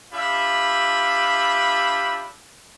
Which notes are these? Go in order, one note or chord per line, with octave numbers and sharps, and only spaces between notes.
D4 F4 G4 E5 B5